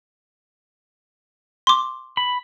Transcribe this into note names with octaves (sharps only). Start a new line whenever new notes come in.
C6 D6
B5